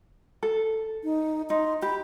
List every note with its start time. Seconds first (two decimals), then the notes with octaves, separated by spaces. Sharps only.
0.43 A4
1.04 D#4
1.50 D#4 C6
1.82 G4 B5